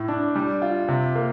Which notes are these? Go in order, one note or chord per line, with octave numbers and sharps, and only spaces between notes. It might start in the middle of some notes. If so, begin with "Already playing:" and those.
Already playing: A2
D4
G3
F4
C3
A#3